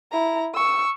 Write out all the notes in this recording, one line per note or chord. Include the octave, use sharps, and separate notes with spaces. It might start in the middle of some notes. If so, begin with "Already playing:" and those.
E4 A#5
C#6 E6